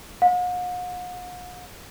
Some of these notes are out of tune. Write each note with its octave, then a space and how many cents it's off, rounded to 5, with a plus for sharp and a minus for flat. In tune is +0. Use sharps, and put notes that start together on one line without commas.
F#5 -45